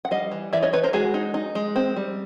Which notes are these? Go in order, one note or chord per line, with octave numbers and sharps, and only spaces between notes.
F#5
G3 D#5 F5
E3
E3 D5 E5
C#5 D#5
E3 B4 C#5
A#4 C5
G#3 F#4 G#4
D#4
D#4
G#3
C4
G3